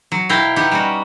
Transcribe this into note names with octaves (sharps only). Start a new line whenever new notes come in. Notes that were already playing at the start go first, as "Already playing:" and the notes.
F#3
B2 E4 F5 G5 A#5
B3 D#4 G4
G3 C#4 F#4